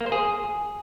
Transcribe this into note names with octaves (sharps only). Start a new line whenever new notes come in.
A#3
C5
G#4